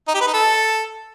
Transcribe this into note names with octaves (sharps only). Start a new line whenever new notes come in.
D#4
G4
B4
D#4
A4